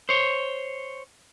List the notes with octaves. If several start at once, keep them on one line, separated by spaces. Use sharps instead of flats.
C5 C#5